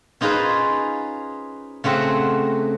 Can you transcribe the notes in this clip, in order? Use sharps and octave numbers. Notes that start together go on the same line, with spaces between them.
C#4 D#4 F4 G#4 B4 C5
C#3 A3 C4 F#4